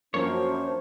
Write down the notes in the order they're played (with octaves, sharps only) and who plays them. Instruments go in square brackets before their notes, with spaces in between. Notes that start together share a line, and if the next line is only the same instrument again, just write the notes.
[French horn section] F#2 [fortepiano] F3 A#3 [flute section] D4 C5 [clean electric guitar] C#5